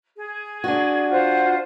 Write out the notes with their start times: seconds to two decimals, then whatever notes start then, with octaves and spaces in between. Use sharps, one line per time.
0.15 G#4
0.64 D4 F#4
1.09 F4 C5 F#5